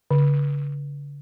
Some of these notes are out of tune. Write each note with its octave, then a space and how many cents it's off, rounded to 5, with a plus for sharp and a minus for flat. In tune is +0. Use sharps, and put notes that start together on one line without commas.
D3 -45